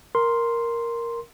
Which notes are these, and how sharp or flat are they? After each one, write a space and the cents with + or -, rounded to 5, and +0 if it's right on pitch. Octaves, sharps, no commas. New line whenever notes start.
A#4 +0 C6 +0